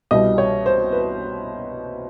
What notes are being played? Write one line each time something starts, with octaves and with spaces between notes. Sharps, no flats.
C2 B2 G3 D#5
C#5
C5
B4